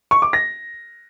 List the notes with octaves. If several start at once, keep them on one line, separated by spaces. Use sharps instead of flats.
C#6
D6
A#6